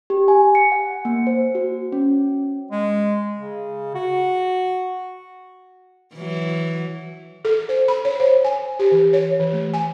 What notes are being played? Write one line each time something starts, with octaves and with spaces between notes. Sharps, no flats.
G4
G#5
C#7
F#5
A#3
C5
F#4
C#4
G#3
C#3
F#4
E3 F#3
A4
C5
B5
C#5
C5
G#5
G4
E3
C#5
E3
A3
G#5